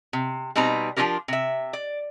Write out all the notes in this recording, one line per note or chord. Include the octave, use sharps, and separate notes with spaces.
C3
B2 G3 C4 D#4 B4 A#5
F3 C#4 D4 F4 G4 A#4
C3 E5
D5